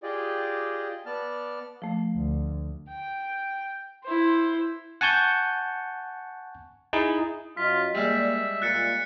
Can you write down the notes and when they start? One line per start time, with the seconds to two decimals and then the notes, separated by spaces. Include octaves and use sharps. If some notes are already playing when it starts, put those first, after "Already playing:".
0.03 F4 G4 G#4 D5 D#5 G5
1.06 B3 D5 A5 F6
1.82 F3 A3
2.15 D2
2.89 G5
4.04 E4 C5
5.01 F#5 G#5 A5 C#6 G6
6.93 D#4 E4 G#4
7.57 F#2 F4 D#5 B6
7.95 G3 G#3 A#3 D5 E5
8.62 A#2 F#6 A6 C#7